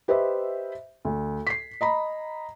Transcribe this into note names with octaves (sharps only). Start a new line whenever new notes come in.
G4 B4 C5 D#5 E5
D2
B6 C7
D#5 A#5 B5